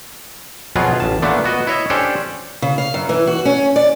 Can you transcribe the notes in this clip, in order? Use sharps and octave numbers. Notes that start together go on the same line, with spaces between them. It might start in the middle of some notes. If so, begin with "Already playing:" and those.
F2 B2 F#3 B3 F4 G#4
A1 A5
A#2 D3 A3 B3 D4
B3 F#4 D#5
E4 C#5 D#5 E5
C#4 D4 G4 A4 C5 D5
C#3
F5
F#2
E3
F#4
C#4
D5